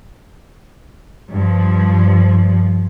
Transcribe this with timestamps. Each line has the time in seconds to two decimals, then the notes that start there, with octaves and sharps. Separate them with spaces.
1.32 G2 F3